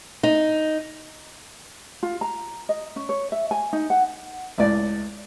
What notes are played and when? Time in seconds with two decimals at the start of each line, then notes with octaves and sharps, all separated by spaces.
0.23 D#4
2.03 F4
2.21 A#5
2.69 D#5
2.96 C#4
3.09 C#5
3.32 E5
3.51 G#5
3.73 D#4
3.90 F#5
4.58 C#2 A2 D5